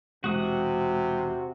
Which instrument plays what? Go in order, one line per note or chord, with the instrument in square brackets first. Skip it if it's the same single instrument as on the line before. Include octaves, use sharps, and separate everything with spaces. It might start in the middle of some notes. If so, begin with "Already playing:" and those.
[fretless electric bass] E1 G#3 [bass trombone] C3 [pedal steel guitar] F#4 D#6